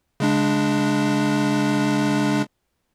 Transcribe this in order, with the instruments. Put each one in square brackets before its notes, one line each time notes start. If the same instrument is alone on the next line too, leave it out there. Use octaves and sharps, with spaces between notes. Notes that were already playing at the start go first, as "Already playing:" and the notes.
[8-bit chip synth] C#3 G#3 D4